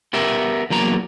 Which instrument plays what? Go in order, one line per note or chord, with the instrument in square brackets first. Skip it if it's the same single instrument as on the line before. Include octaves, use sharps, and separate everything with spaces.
[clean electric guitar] B3 G4 A#4 E5
E2 F#3 A#3 A#5